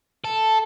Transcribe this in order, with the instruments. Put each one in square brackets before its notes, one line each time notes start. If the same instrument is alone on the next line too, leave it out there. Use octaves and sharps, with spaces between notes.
[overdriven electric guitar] A4